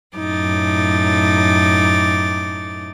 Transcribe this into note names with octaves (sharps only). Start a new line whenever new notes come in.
F#2 A2 D#4 D6 A6